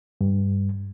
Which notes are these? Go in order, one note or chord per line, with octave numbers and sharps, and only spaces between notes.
G2